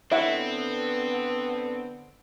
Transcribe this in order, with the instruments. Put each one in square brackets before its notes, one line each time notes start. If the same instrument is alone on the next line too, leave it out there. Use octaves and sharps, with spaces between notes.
[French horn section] D3 B3 [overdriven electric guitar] C4 [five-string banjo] E4 [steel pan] C#5 E5 F#5